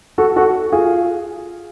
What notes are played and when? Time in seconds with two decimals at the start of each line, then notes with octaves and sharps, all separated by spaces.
0.18 F#4 A4
0.36 F#4 A4
0.72 F4 G#4